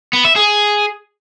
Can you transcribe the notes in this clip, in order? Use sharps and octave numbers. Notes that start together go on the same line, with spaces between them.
B3
E5
G#4